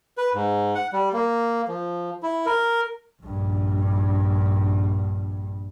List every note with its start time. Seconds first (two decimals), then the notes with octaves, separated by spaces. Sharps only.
0.18 B4
0.34 G#2
0.75 F#5
0.93 G3
1.13 A#3
1.68 F3
2.23 E4
2.46 A#4
3.23 A#1 G2